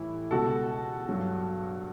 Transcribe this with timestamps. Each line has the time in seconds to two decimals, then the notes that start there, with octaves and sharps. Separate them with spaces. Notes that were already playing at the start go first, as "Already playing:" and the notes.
Already playing: A2 E3 G3 E4
0.31 C#2 B2 G3 F#4 A4
1.09 G2 F#3